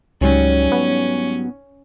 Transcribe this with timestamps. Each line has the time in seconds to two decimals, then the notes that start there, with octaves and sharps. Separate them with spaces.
0.21 C#2 G#2 F#3 G3 C#4
0.72 B3